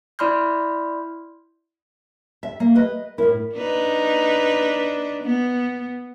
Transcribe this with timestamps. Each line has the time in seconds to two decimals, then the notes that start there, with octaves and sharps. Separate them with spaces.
0.19 E4 D5 B5 C6 F6 G6
2.43 E5
2.60 A#3
2.75 B4 D#5
3.18 A2 E4 A#4
3.55 D4 D#4 B4
5.23 B3